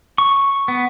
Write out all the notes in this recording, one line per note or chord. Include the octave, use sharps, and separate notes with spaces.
C#6
B3